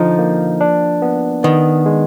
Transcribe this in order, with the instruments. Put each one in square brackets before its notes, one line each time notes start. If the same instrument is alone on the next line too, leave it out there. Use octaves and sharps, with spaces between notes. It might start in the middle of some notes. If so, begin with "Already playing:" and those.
Already playing: [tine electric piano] D3 D#4 [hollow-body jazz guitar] F3
[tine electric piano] A#3
D4
B3
[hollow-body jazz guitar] D#3 [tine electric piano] B3
[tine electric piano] G#3